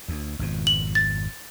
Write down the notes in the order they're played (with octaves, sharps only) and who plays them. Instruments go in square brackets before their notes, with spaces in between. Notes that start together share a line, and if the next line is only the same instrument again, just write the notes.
[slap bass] D2
G#1 F2 B2
[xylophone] F#7
A6